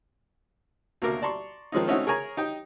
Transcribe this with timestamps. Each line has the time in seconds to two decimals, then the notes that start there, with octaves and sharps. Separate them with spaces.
1.02 D2 B2 A#3 A#4 D6
1.22 D5 A5 A#5 C6 C#6
1.72 D#3 F3 G#3 C#4 D#4
1.87 A3 C4 C#4 D#4 E4 F#4
2.07 G#4 A#4 C#5 G#5 A#5
2.37 D#4 G4 G5